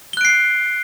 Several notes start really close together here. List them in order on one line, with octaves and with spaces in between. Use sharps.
G7 F#6 D7 C7